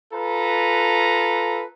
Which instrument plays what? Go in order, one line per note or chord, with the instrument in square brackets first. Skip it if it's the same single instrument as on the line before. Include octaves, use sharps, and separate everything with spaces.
[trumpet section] F4 A4 B4 A#5